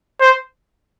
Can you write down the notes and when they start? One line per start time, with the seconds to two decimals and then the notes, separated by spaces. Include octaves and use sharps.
0.21 C5